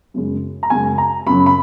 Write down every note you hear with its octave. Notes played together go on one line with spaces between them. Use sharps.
F#2 C#3 G#3
A#5
F#2 C#3 G#3 G#5
A#5
F#2 C#3 F#3 B5
B5